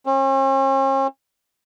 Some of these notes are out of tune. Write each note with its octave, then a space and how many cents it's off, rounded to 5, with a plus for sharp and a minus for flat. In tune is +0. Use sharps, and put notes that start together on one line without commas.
C#4 -45